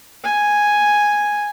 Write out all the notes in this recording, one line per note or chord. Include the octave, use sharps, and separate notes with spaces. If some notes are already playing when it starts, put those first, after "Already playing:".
G#5